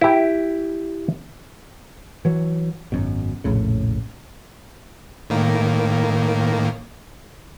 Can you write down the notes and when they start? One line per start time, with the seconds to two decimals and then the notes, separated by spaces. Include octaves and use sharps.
0.01 E4 G4
2.25 E3 F#3
2.92 G#1 F#2 B2
3.44 F1 A#1 A2 C#3
5.30 A2 D#3 A#3